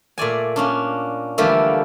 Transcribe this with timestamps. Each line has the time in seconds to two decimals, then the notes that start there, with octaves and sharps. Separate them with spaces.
0.18 A#2 A3 D5 G#5
0.56 A#3 C#4 D4
1.38 D3 E3 F3 G3 A3 A#3